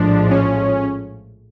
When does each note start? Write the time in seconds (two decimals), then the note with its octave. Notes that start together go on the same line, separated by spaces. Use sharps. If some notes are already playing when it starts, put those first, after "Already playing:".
Already playing: A#1 A2 F3 G#3 D4
0.30 C#4